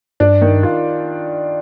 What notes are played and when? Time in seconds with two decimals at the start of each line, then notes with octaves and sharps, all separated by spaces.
0.20 G2 D4
0.41 D#3
0.63 F4